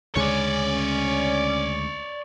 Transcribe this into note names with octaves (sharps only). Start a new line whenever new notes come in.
D2 C#3 G#3 C#4 C#5 D5